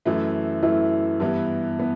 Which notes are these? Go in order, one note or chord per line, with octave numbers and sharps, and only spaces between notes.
F#2 E3 A3 E4
F#2 E3 A3 E4
G2 E3 B3 E4
E3 B3